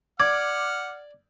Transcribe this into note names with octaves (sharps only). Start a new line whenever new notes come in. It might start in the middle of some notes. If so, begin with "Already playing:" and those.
D5 F#5 D6 F6 G#6